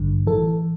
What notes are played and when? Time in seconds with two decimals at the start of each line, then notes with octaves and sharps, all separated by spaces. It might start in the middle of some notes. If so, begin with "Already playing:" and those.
Already playing: A1 G2 D3
0.27 A2 E3 A4